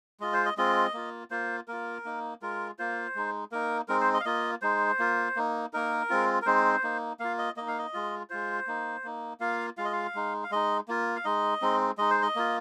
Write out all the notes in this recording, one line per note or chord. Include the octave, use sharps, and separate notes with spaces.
G#3 F4 D#5
C5
D#5
G#3 C4 F4 D#5
A#3 F4
A#3 F4 C5
A#3 F4 A#4
A#3 D#4
G#3 F4 A#4
A#3 F4 C5
G#3 D#4
A#3 D#4 A#4
G#3 C4 D#4 A#4
C5
D#5
F5
A#3 F4 D#5
G#3 D#4 C5
A#3 F4
A#3 D#4
A#3 D#4 A#4
G#3 C4 F4
A#4
G#3 C4 D#4 C5
A#3 D#4
A#3 F4 F5
D#5
A#3 D#4 D#5
F5
D#5
G#3 F4
G#3 F4 C5
A#3 D#4
A#3 D#4
A#3 F4 F5
G#3 F4 F5
D#5
F5
G#3 D#4
F5
G#3 D#4 D#5
A#3 F4
F5
G#3 D#4 D#5
G#3 C4 D#4
G#3 D#4 D#5
C5
D#5
A#3 F4